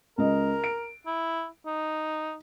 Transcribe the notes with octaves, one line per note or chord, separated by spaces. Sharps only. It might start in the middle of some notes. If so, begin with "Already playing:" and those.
C#2 A#4 D#5
D7
E4
D#4